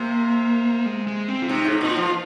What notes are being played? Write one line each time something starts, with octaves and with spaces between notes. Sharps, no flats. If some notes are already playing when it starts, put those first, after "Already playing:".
Already playing: C3 A#3
G#3
G#3
C4
F4
C3 D#4
G#2
A#2 D#4
F4
F3